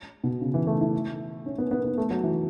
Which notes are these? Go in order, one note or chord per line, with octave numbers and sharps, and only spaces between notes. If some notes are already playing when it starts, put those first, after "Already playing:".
B2
C#3
E3
A3
E4
C#4
B3
B3
B3
A3
F#3
E3